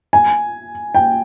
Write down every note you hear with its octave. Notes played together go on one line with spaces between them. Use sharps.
G#5
G5